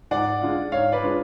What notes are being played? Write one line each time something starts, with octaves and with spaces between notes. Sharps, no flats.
G#2 D5 F#5
G#3 D4 F4
G#2 C#5 F5
B4 D5
G#3 D4 F4